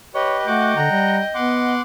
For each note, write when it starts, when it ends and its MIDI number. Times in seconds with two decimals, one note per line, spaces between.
0.14 0.46 67
0.14 0.46 71
0.14 0.38 73
0.14 1.73 75
0.47 0.74 57
0.47 0.76 66
0.47 0.76 78
0.47 1.41 79
0.47 0.76 86
0.77 0.91 50
0.77 1.17 78
0.77 1.17 82
0.91 1.21 55
1.35 1.81 59
1.35 1.81 78
1.35 1.81 84
1.35 1.81 86